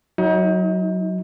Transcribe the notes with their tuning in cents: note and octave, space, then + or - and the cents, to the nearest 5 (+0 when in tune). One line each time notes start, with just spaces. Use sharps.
F#3 +0 D#4 +40